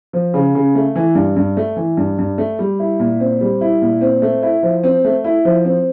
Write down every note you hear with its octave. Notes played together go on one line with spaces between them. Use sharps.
F3
C#3
C#3
A3
E3
G2
G2
A3
E3
G2
G2
A3
G3
E4
A#2
C4
G3
E4
A#2
C4
A3
E4
F3
C4
A3
E4
F3
C4